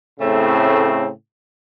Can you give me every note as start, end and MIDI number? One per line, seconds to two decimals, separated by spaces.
0.20 1.08 45
0.20 1.08 49
0.20 1.08 57
0.20 1.08 60